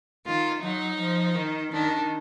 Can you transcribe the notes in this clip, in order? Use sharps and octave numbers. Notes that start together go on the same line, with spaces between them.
D#3 F4
F#3 D#4
F3
D#3
D#3 D4